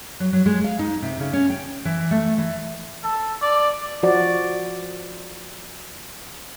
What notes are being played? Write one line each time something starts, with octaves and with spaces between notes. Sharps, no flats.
F#3
F#3
G#3
F5
D#4
C3
C#3
C#4
G5
E3
A3
E3
A4
D5
F3 F#4 D5